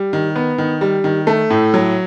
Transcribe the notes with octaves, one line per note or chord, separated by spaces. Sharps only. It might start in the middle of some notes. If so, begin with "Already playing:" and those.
Already playing: G3
D#3
B3
D#3
G3
D#3
A3
A2
F#3